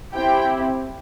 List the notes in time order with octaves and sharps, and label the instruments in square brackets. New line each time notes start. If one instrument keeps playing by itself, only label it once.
[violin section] C4 E4 G4 G5